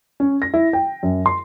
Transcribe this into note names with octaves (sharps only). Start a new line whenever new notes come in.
C#4
A#6
E4
G5
F#2
C6